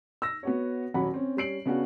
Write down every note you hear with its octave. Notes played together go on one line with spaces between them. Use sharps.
E6 A#6
B3 F#4 C#5
D#1 F#3 F#5 B5
C4 C#4
G3 C#4 C7 D7 F#7
C#3 B3 D4 F#4